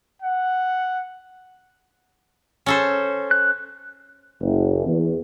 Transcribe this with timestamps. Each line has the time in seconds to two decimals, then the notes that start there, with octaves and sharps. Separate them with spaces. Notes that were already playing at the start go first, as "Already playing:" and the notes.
0.22 F#5
2.66 C#4 A4 C5
3.31 F#6
4.42 F#1
4.87 E2